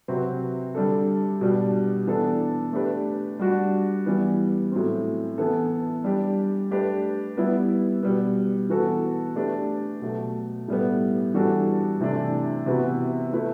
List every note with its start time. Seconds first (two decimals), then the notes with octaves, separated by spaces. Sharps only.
0.08 C3 F#3 C4 F#4 B4
0.75 D3 G3 D4 A4
1.41 B2 G3 D4
2.07 E3 B3 D4 A4
2.73 A3 D4 G4 B4
3.39 G3 D4 F#4
4.06 E3 G3 B3
4.72 A2 F#3 C4
5.38 E3 B3 E4 A4
6.04 G3 D4 G4
6.71 A3 D4 G4 B4
7.37 G3 B3 E4 B4
8.03 B2 G3 B3
8.70 E3 B3 F#4 A4
9.36 A3 D4 G4 B4
10.02 B2 F#3 A3
10.68 A2 G3 B3
11.34 E3 G3 D4 F#4 A4
12.01 C3 E3 A3 D4
12.66 C3 E3 B3 F#4 B4
13.33 A3 E4 B4